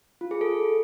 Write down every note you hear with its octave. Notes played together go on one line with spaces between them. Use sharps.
F4
G#4
A4